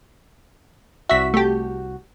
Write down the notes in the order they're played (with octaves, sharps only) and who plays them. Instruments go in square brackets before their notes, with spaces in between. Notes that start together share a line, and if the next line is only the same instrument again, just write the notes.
[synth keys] C2 F#4 [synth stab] E5 B6
[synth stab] A3 G4